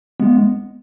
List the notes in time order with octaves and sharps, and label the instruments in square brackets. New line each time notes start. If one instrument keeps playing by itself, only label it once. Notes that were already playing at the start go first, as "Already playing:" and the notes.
[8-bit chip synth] G#3 B3